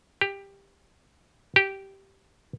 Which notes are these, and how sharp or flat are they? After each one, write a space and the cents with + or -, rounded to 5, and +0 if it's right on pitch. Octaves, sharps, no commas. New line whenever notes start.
G4 +15
G4 -10